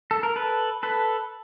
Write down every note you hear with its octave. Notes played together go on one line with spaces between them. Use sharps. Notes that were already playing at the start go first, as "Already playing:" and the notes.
A4
A#4
A4 B4
A4 B4